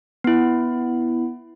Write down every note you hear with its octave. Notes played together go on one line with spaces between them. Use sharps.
B3 E4